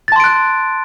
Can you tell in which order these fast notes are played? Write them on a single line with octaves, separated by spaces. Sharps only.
A6 A5 C6 D7 F#6